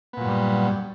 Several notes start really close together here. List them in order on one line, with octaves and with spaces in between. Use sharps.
B3 A#2 F#3 G2 G3